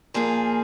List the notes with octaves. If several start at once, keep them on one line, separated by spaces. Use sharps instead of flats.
A#2 F3 A#3 F4 G#4